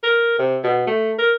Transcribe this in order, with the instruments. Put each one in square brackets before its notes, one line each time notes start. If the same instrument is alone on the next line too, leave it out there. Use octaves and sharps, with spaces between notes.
[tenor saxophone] A#4
C3
B2
A3
A#4